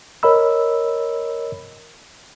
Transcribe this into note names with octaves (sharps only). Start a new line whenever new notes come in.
A#4 C#5 D#5 B5 E6